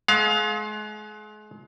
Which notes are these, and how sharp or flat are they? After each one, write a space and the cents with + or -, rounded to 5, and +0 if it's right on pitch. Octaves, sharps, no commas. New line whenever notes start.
G#3 +35 F5 +20